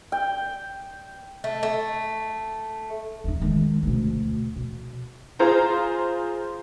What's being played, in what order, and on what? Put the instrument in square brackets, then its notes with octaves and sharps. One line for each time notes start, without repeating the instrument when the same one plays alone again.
[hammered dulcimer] G5
[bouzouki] A3
A3
[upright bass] D#1 D#4
D#3 G#3
D2 B2
B2
[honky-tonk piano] F4 G#4 C5 A#5